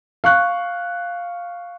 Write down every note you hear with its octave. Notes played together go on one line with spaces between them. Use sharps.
F5 C#6 F#6